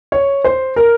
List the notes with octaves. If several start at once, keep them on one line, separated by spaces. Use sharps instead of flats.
C#5
C5
A#4